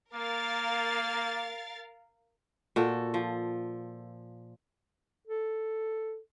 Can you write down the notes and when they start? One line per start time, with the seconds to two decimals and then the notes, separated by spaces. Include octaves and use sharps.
0.14 A#3 A#4 F5 A6
2.76 A#2 F#4 A4
3.14 F3
5.27 A4